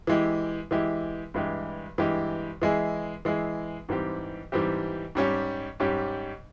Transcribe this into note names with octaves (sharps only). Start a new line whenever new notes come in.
E3 G#3 E4 G4
E3 G#3 E4 G4
G2 E3 G#3 E4 G4
G2 E3 G#3 E4 G4
E3 G#3 E4 G#4
E3 G#3 E4 G#4
G#2 E3 G3 C4 G4
G#2 E3 G3 C4 G4
G#2 G3 C#4 G4
G#2 G3 C#4 G4